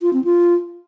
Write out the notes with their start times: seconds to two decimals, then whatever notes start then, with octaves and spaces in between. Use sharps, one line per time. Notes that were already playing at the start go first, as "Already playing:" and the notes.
0.02 F4
0.13 C4
0.24 F4